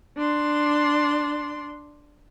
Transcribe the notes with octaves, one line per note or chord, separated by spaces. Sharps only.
D4 C6